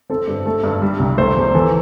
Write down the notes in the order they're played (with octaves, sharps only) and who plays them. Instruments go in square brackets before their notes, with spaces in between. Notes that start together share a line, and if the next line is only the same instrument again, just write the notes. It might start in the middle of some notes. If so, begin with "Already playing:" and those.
[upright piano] C4 A4
G2
A3 A4
G2
G3
C2
A3 C5
E2
E3 A4